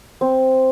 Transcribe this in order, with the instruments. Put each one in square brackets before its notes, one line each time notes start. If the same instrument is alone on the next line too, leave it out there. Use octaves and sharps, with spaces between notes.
[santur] C4